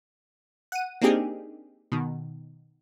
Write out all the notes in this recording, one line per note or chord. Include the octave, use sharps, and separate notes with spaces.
F#5 D#7
A#3 C4 D4 D#4 G4 G#4
B2 D#3